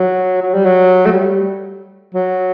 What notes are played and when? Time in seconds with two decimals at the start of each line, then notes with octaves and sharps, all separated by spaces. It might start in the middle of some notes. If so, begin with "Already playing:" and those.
Already playing: F#3
0.42 F#3
0.54 G3
0.65 F#3
1.06 A3
1.11 G3
2.14 F#3